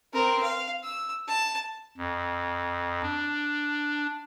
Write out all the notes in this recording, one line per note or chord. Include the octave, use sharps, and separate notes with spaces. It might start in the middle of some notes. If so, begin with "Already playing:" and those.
C4 A#4
F5
E6
A5
F2
D4